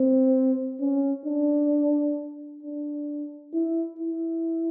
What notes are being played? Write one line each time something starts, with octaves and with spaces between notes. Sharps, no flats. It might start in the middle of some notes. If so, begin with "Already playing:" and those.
Already playing: C4
C#4
D4
D4
E4
E4